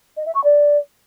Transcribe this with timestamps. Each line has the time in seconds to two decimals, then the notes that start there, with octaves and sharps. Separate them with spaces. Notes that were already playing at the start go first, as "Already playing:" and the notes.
0.17 D#5
0.26 E5
0.35 C#6
0.44 D5